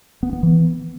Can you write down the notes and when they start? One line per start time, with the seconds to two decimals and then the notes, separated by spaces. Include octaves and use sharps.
0.23 B3
0.33 B3
0.43 E3